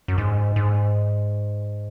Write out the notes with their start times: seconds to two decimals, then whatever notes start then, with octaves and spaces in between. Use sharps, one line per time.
0.08 F#2
0.18 G#2
0.56 G#2